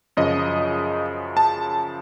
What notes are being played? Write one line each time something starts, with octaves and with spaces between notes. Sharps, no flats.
F#2 C#3 F3 D#5
A5